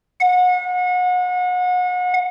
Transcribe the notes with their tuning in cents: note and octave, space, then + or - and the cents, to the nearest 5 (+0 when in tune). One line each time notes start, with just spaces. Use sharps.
F#5 -35